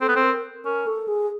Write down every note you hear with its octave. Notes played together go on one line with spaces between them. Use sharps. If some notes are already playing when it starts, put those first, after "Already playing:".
C4 A4
B3
C4
A#4
C#4 A#4
A4
G#4